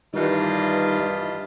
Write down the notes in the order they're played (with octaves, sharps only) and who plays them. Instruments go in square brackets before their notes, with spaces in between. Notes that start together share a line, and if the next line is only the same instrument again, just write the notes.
[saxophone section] G2 E3 [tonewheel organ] D#3 G3 D#4 [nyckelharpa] F4 D#5